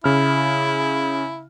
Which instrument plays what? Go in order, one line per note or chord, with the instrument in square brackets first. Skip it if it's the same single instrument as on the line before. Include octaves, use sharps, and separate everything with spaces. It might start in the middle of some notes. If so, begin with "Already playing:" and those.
[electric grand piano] C#3 F6 [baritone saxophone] E4